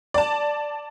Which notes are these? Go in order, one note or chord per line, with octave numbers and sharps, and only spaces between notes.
D5 A5